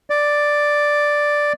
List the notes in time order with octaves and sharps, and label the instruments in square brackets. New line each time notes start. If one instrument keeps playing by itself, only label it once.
[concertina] D5